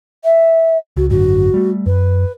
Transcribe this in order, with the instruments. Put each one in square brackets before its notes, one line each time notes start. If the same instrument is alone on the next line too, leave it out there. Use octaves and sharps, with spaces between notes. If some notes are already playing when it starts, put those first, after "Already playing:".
[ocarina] E5
[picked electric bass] C#2 [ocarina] F#4
[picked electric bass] G#1 F#2 D3 [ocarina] F#4
[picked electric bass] G3 A3
[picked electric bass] F#2 [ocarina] B4